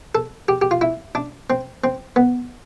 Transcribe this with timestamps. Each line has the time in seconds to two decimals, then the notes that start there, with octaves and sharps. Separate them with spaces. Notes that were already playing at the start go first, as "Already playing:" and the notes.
0.15 A4
0.48 G4
0.62 G4
0.71 F4
0.81 E4
1.15 D4
1.50 C4
1.84 C4
2.16 B3